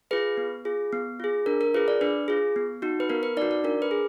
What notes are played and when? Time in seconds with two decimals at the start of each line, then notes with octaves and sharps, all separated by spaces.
0.11 F4 G#4 B4
0.37 B3
0.65 F4 G#4
0.93 B3
1.20 F4 G#4
1.46 D4 A#4
1.61 A#4
1.74 F4 G#4 B4
1.88 D5
2.01 D4 B4
2.28 F4 G#4
2.56 B3
2.82 D#4 F#4
3.00 B4
3.10 B3 A#4
3.23 B4
3.37 D#4 D5
3.42 F#4
3.51 D5
3.64 D4 A#4
3.82 B4
3.91 G#4